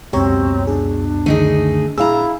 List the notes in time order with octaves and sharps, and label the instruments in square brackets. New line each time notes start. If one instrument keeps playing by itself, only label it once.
[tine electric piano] C#2 F#2 [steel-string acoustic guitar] B2 [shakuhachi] C4 [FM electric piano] G4 C#5 A#5
[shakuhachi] D4 [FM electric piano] G#4
[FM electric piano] D3 D#3 [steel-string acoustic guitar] A3 D#4 G#4
[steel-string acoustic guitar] A#2 D4 A#5 [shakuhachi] E4 [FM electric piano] G#4 [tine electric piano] F5 E6